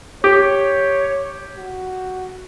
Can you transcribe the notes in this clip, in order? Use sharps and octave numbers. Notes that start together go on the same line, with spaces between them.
G4 C#5
F#4